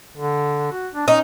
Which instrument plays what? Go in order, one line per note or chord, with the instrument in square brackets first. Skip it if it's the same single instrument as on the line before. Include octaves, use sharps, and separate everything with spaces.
[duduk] D3
F#4
D4
[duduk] C#4 [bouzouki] D#4